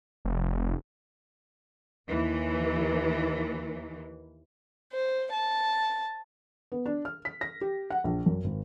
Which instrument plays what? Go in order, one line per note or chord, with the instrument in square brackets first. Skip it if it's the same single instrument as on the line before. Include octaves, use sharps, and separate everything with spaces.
[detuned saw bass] F1
[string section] D#2 E3
[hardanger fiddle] C5
A5
[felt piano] B3
D4
F6
B6
A#6
G4
F#5
A#1
F#2
G#1